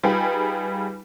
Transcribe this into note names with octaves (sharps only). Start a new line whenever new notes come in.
G3 D#4 F4 G#4 B4 G5